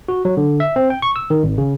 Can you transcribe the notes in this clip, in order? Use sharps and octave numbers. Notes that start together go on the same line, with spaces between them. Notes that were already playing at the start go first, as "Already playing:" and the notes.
F#4
F#3
D3
E5
C4
G5
C#6
E6
D#3
G#1
C#3